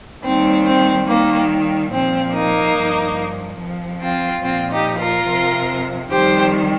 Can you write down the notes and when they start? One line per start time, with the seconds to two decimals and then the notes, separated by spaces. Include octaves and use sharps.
0.23 D#2 D#3 G3 C4
0.65 C4
1.07 D#2 D#3 G3 A#3
1.91 A#2 F3 C4
2.33 A#3 D#4
2.75 G2 F3
3.60 F2 F3
4.01 C4 F4
4.44 A#2 F3 C4 F4
4.71 D#4 G4
4.99 F4 A#4
5.28 F2 C3 F3
6.11 F2 D#3 G3 G4 C5